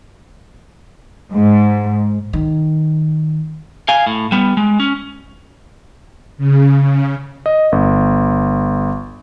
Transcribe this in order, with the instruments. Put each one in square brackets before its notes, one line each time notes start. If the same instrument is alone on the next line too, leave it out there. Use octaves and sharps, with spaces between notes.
[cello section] G#2
[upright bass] D#3
[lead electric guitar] F5 G#5
A2
G3 B3
G#3
C#4
[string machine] C#3
C#3
[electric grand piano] D#5
G1